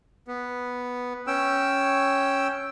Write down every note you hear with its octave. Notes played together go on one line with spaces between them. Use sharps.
B3
C#4 G5 E6